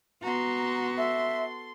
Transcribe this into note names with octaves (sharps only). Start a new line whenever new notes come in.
B3 F#4 A#5 C6
A4 E5 C6